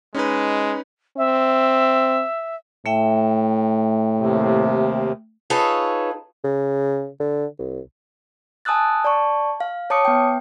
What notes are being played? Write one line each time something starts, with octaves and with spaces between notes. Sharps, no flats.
G#3 C#4 D#4 B4
C4 E5
A2 A3 E5 G5
D#2 C3
D#4 F4 G#4 A4 B4 C#5
C#3
D3
C2
G#5 A5 D#6 E6 F#6 A6
D5 A5 C#6
F5
C#5 A5 D6 D#6 C#7
B3 G5